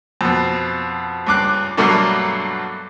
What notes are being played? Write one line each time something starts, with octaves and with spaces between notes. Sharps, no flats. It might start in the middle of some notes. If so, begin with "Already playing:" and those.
F2 B2
C#2 G2 D6 F#6
G2 B2 F#3 A3 A#3 D4